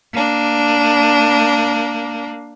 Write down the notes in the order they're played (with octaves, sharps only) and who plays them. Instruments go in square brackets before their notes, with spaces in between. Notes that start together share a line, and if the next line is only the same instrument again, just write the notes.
[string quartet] A#3 D4